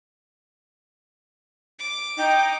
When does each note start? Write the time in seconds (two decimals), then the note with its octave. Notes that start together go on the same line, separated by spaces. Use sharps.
1.79 D6
2.18 D#4 G5